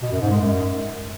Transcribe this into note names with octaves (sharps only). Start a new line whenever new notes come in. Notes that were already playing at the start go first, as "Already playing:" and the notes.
B2
F#2
G#2
G#3
F#2